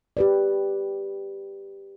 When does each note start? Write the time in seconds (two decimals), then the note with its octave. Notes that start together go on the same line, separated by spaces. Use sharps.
0.17 G4 B4 D5